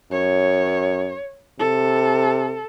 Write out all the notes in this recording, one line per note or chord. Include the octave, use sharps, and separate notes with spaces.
F#2 C#5
C3 A4